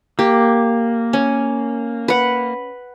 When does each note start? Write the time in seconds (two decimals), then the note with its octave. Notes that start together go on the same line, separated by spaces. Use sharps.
0.19 A#3 G4
1.13 C#4
2.08 B4 F#5